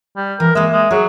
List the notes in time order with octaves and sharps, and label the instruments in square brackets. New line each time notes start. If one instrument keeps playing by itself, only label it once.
[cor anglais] G3
[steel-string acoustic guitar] E3 [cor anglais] A#4
[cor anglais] G#3 [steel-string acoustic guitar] A#3 E5
[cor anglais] G#3
[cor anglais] F#3 [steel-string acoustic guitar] G#4